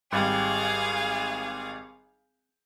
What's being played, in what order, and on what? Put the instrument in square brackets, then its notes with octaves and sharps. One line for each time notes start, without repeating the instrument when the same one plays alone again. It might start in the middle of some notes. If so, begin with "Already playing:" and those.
[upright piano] G#1 G3 [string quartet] G#4 F5